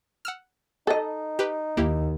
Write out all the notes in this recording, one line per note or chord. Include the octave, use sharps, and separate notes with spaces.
F#5 E6 F6
D#4 A4 D#5
G4 B4
D#2 A#3 E4 G4